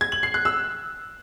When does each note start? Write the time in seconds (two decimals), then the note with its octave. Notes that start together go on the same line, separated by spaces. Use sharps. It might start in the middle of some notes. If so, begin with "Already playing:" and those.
0.01 G#6
0.12 F#7
0.23 C7
0.34 F#6
0.45 E6